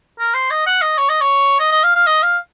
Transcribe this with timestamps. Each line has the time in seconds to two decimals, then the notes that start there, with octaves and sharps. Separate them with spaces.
0.19 A#4
0.34 C5
0.51 D#5
0.66 F#5
0.81 D#5
0.98 C#5
1.09 D#5
1.21 C#5
1.60 D#5
1.72 D#5
1.83 F5
1.95 F5
2.07 D#5
2.23 F5